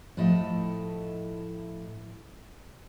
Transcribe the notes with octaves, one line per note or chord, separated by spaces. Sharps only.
A2 F3 A3 E4 D#5 A5